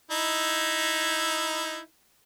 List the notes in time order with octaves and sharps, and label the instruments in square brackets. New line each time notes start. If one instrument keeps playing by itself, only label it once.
[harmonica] D#4 E4